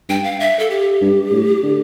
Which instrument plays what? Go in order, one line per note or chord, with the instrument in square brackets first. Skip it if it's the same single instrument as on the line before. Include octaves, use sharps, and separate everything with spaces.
[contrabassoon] G2 [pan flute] G5
[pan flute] F5
E5
A4
G4
[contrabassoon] G2
A2
D3